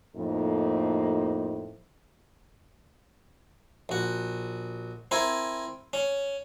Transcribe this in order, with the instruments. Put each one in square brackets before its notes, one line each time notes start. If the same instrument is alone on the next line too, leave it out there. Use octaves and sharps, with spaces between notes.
[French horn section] F2 A2 A#3 D#4
[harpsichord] A#1 F#4
C4 E4 A#4 G#5
C#4